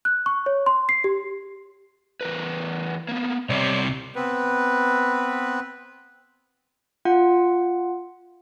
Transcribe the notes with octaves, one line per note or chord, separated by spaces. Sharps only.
F#6
C#6
C#5
C6
C7
G4
E2 A#4 B4
A#3 B3
C2 C3 C#5 D5
B3 C4 B4
F4 F#5